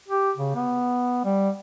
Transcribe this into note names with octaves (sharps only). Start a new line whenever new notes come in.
G4
C#3
B3
G3